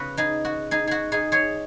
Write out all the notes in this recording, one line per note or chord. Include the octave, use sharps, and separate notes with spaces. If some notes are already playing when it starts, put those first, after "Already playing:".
Already playing: C#3 B3 F#4 B4
D#4 G#4
F#4
D#4 G#4
F#4 G#4
D#4 G#4
G#4 C#5